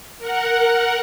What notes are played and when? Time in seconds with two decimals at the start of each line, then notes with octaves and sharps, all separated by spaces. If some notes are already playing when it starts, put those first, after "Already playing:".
0.19 A#4 F#5